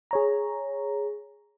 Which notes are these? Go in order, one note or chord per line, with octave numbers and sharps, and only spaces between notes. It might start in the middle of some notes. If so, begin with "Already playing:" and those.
G#4 C#5 A#5